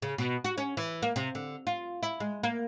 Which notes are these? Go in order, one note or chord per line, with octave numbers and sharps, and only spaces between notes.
C#3
B2
F#4
C#4
E3
A#3
C3
D3
F4
E4
G#3
A#3